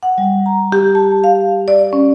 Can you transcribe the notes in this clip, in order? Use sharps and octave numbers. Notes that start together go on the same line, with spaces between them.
F#5
G3
A#5
G4
A5
F5
D5
C#4